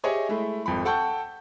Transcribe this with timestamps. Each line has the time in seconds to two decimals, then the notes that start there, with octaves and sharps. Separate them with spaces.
0.04 G4 G#4 C#5 D#5 E5 G#5
0.29 G#3 A3 E4
0.66 G#1 F2 B5
0.85 A4 F#5 G5 A5 C#6 G6